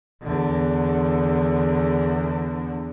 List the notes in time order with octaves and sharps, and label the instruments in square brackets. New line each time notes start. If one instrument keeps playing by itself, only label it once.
[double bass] E2 D3